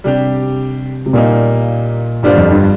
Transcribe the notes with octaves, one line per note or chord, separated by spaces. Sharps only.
C3 G3 D4 G4
C3
A#2 G3 A#3 D#4
G2 D3 G3 D4 F4 C5
F2
G2